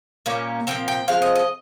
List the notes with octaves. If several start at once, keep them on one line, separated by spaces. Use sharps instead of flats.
A#2 G3 A#3 C#4
A#2 F3 C4 G5
G5
F3 G#3 C4 F5
D#5
D#5